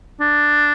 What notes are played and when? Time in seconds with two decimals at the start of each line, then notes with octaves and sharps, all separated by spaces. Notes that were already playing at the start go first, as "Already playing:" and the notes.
0.20 D4